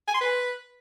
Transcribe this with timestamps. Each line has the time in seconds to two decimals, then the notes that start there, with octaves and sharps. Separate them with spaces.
0.08 G#5
0.14 C6
0.21 B4